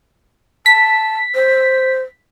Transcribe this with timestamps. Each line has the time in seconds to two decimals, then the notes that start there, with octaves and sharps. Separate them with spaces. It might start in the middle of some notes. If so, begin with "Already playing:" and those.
0.66 A5 B6
1.35 C5